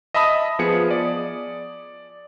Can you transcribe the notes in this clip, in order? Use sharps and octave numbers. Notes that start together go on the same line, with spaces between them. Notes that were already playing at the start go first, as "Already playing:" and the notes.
D#5 E5 A5 B5 D#6
F3 B3 G#4 C#7
D5